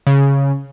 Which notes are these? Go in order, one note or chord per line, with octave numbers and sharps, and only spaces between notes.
C#3